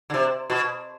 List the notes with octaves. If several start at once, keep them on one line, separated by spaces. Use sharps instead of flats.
D3
C3
B2